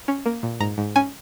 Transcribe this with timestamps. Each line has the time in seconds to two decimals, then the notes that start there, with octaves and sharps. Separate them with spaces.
0.08 C#4
0.26 A#3
0.43 A#2
0.60 G#2 A#5
0.78 G#2
0.96 C#4 G#5